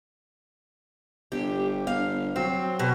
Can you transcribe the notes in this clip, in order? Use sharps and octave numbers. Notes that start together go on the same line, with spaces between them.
G1 G4
G1 F5
F#3 C4
B2